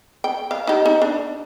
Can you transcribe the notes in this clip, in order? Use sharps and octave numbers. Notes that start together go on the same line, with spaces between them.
G5
F5
D#4 G4
D#4
D4